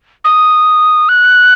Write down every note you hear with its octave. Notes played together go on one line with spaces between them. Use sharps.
D#6
F#6